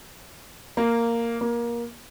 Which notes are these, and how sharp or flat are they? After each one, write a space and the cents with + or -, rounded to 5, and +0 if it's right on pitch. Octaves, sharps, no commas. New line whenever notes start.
A#3 -5
A#3 +20